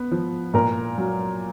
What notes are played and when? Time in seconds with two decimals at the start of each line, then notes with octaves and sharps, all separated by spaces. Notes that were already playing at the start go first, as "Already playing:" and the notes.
Already playing: B3
0.11 F3
0.54 A#2 A#4
0.98 F#3